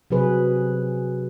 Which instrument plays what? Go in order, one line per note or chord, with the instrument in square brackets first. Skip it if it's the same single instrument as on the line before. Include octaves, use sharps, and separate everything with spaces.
[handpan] C3 F#3 G#4 B4